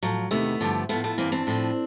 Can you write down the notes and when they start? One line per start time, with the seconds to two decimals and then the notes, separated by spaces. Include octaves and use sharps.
0.03 A2 F3 F#3
0.31 E2 C3 D#3 A3 B3
0.61 G2 D3 F3
0.89 A2 F3 A3 B3
1.04 A3 B3
1.18 G2 E3 A#3 C4
1.32 C4 D4
1.47 A2 F3